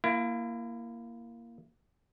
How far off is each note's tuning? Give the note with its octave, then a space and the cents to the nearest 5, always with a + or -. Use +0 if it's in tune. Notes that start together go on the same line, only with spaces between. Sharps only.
A#3 +0 E4 +30